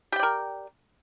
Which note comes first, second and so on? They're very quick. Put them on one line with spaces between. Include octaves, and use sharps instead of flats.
G4 G5 D5 A#4